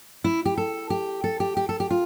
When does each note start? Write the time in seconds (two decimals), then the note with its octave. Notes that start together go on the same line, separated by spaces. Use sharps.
0.24 E4
0.45 G4
0.57 A4
0.90 G4
1.24 A4
1.40 G4
1.57 G4
1.69 A4
1.80 G4
1.90 F4